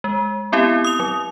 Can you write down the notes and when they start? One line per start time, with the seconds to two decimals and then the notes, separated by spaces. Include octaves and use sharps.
0.04 G#3
0.52 B3 C4 E4 G4
0.84 D#6 F7
1.00 F#3